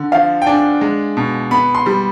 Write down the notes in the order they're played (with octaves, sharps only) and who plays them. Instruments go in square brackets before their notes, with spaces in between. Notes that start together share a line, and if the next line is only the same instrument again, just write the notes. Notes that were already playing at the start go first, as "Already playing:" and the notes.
Already playing: [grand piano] D3
F3 F5
G5
D4 G#5
G#3
B2
B3 B5
C6
G3